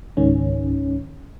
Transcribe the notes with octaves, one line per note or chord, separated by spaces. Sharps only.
C#2 G#2 D#3 C#4